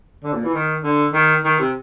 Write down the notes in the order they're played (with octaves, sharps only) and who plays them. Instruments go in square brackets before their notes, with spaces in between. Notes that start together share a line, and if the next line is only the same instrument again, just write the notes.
[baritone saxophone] D3
A#2
E3
D#3
D3
D#3
D#3
C3